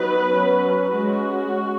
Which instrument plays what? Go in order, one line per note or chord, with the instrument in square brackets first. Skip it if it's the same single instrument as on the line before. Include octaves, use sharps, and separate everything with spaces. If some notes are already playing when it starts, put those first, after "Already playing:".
Already playing: [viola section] F#3 B3 D#4 B4
F#3 C#4
G#3 C#4 F#4